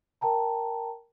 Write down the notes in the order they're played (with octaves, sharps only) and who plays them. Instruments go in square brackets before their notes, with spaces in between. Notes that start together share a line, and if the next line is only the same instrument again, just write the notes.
[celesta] A#4 G5 A5 A#5